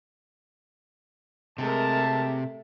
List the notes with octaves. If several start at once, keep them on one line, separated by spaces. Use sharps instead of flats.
C3 G#3 A3 A#4 E5 A5